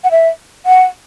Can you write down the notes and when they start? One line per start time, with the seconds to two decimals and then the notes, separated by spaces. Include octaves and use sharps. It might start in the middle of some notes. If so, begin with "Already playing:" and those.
0.04 F#5
0.11 E5
0.66 F#5